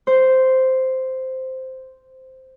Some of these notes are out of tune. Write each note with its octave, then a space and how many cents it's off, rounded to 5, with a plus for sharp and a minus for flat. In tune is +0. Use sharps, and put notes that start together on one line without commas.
C5 -5